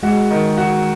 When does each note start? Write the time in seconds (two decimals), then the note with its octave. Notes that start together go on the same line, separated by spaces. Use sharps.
0.03 G#3 F#4
0.31 D#3
0.58 F#4